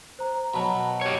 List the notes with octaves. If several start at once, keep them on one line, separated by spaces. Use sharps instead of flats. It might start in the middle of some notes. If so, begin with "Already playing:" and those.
C5 A#5
B2 F#3 A5 B5
G4 C#5